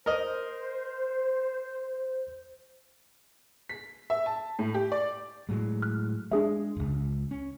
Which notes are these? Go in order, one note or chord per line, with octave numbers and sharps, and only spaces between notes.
A#4 C5 D#5
B6
E5
A5
A2
G4
D5
A2 F#3 G#3
F6 F#6
G#3 D4 G#4 E5
D1 C#2
C#4